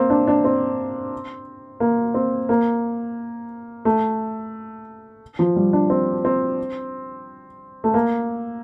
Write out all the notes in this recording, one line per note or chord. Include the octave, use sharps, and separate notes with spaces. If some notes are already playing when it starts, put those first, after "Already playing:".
Already playing: A#3 C4
D4
D4
C4
A#3
C4
A#3
A3
F3
G3
D4
C4
C4
A3
A#3